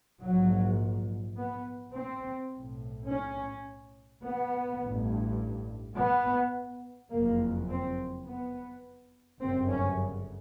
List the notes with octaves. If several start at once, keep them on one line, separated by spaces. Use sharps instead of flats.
A#1 G#2 F#3
B3
C4
B1 A2
C#4
B3
A1 G2
B3
F#1 F2 C#3 A#3
C4
B3
G1 F#2 C#3 C4
C#4